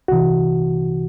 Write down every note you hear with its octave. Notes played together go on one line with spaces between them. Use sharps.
C2 C3 E3 F#4